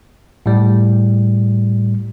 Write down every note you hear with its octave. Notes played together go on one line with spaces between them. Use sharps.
A2 G3